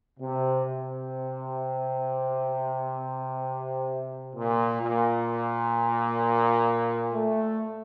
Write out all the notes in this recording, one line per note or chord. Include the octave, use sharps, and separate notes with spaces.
C3
C3
A#2
A#2
A3